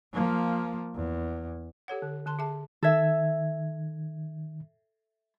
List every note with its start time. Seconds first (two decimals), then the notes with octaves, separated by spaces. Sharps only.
0.13 F3 A#3
0.95 E2
1.88 G4 A4 C#5 F#5
2.02 D3
2.26 D3 A5 C6
2.39 G#4 E5 A5
2.83 D#3 A4 E5 G#6